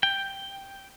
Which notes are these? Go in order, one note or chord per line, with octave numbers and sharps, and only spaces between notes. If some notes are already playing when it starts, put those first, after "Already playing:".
G5